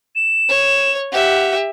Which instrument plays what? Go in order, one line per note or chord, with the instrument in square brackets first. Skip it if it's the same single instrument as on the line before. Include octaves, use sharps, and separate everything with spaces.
[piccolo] E7
[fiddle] C#5
[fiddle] G4 E5 [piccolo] F#5